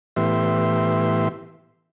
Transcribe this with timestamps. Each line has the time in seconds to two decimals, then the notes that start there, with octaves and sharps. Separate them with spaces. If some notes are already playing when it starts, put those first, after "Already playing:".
0.16 A2 E3 B3 G4 E5 C6